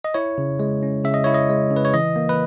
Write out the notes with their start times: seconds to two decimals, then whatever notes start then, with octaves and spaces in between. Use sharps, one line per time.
0.04 D#5
0.14 E4 C#5
0.38 C#3
0.60 G#3
0.83 C#4
1.04 C#3 E5
1.14 D#5
1.24 E4 C#5
1.34 D#5
1.50 G#3
1.71 C#3
1.76 B4
1.85 C#5
1.94 E3 D#5
2.16 A#3
2.29 B4